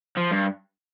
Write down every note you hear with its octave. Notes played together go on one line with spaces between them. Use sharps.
F3
G2